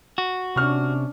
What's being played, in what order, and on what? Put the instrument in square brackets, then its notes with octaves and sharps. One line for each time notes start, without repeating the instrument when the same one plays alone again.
[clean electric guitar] F#4
[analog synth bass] C3 [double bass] C#4 D4 [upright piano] C#6 F6